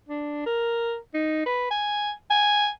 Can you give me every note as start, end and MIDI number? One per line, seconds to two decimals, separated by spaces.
0.09 0.44 62
0.46 0.96 70
1.14 1.43 63
1.46 1.69 71
1.71 2.12 80
2.30 2.70 80